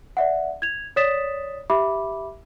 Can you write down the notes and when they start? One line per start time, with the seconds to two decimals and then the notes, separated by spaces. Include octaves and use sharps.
0.17 D5 E5 F#5
0.62 G#6 F7
0.96 C#5 D5 D#6 A6 B6 E7
1.70 G4 E5 B5 D6